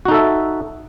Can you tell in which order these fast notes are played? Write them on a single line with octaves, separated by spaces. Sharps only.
F#4 D#4 A4 E5